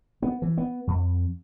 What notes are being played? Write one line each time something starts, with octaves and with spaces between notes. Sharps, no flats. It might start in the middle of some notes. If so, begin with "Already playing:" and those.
B3
E3
B3
F2